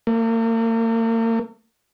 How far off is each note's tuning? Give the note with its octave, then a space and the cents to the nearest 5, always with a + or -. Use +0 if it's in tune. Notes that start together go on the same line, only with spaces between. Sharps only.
A#3 -40